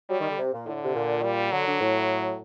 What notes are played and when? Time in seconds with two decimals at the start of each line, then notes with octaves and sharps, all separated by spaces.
0.10 F#3 G3
0.20 D#3
0.29 D3
0.38 C3
0.53 A#2
0.67 A2 D3
0.83 C3
0.95 A#2
1.23 G3
1.52 D3 F#3
1.67 D3
1.80 A2